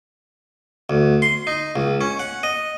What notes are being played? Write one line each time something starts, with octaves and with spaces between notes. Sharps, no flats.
D2
C6
D#4
C#2
C#4
F#5
D#5